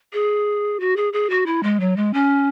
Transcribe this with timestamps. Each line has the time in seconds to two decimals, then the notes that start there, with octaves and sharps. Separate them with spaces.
0.13 G#4
0.80 F#4
0.96 G#4
1.13 G#4
1.30 F#4
1.46 E4
1.63 G#3
1.80 F#3
1.96 G#3
2.14 C#4